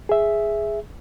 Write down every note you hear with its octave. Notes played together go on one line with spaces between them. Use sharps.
G#4 E5